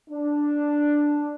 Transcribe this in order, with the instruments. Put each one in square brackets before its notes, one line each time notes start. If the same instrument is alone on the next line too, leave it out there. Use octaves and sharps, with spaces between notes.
[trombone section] D4